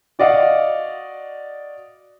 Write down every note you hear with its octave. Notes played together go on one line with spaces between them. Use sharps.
F#4 D5 D#5 F5 F#5